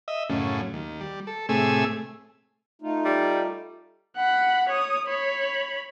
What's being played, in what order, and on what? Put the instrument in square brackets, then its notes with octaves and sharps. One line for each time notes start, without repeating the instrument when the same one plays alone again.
[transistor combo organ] D#5 E5
F#2 A2 C#3
D#2
G3
A4
A2 C3 A3 G#4 G#5 E6
[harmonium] A3 D#4 F4
[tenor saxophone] G3
[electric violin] F#5 B5
C#5 D#6
C#5 B5